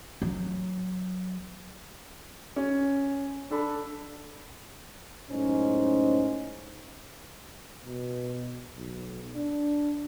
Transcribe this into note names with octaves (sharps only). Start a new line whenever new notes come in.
F#3
C#4
D4 A4 B5
F#2 A2 G#3 C#4 D#4 C5
B2
B1
D4